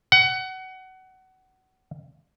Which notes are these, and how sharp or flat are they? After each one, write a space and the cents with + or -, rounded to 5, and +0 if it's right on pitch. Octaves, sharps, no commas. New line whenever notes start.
F#5 +25